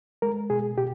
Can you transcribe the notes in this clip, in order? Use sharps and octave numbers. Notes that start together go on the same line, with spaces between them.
G#3 A#4
B2 G#4
B2 G4